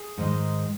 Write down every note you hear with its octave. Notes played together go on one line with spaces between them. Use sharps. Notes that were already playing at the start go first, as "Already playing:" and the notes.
Already playing: G#4
G#2 D#3 G#3